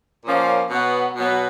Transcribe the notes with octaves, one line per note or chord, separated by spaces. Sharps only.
A#2 F3 A#3 C#4
B2 F#3 B3
B2 F#3 B3